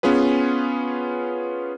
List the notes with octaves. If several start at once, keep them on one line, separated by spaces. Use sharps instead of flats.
B3 C#4 F4 G#4 B4